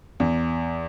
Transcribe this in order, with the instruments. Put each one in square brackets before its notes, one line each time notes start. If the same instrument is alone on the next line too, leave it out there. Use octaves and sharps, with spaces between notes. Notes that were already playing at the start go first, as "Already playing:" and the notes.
[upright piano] E2